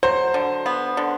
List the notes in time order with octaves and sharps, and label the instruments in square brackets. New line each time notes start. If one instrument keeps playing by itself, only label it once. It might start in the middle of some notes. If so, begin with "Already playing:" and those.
[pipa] F#3 [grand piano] C5
[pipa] D3
B3
D3